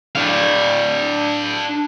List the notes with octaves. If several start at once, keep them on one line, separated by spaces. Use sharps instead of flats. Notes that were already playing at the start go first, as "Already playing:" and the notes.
D4 F5